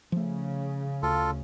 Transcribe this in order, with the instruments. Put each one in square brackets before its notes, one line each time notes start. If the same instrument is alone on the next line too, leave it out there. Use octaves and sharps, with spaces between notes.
[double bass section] C#3 [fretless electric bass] F3 A3
[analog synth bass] D2 [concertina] F4 A4